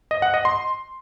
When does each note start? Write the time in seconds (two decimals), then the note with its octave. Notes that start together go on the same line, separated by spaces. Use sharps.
0.11 D#5
0.22 F#5
0.34 D#5
0.45 C6